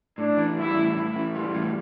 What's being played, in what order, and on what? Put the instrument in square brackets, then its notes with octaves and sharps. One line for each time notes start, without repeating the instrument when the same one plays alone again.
[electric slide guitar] A2 [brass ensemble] D4
[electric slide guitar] E3
[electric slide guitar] G3 [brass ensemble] E4
[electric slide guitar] A2
[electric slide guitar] A2 [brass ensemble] E4
[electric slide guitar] E3
[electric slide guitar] G3 [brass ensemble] F4
[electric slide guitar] A2